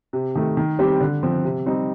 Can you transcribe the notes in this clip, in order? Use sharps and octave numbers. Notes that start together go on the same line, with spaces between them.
C3
D#3 A3
D#3
G3 C4 G4
D3
F3 C4
C3
G3 C4 D#4